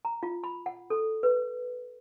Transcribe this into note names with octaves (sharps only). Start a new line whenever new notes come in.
A#5
F4
B5
F#5
A4
B4